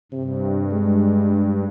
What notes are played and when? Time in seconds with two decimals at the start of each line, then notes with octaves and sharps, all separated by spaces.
0.12 G2 C3
0.71 G#3